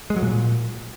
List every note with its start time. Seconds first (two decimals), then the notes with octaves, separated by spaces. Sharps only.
0.10 G#3
0.16 F#3
0.22 A#2